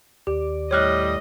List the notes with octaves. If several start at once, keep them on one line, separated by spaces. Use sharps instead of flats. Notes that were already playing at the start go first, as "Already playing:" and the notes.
D#2 G4 D5
A2 G3 C#5 D#5 F6 F#6